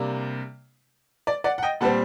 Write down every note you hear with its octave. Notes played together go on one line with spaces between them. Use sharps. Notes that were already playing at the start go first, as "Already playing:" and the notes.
Already playing: C3 G3 A#3 D4
D5
D5 F#5
F#5
D#5 G5
A#2 G3 C4 F#5 A5